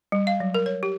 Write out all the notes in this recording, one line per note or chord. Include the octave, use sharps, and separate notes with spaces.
G3
F5
F#3
A#4
C#5
G4